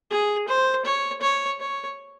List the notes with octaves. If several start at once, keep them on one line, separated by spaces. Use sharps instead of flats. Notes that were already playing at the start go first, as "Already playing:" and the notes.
G#4
C5
C#5
C#5
C#5